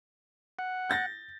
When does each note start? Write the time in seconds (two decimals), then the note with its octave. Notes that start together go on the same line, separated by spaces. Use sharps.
0.59 F#5
0.90 G6 A6 A#6